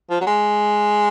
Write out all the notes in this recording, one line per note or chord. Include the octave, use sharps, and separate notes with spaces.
F3
F#3
G#3